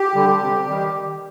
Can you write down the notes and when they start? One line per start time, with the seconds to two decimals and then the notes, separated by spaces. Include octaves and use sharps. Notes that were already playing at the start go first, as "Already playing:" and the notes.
Already playing: G4
0.15 D3 G3
0.41 C3
0.67 D#3 G3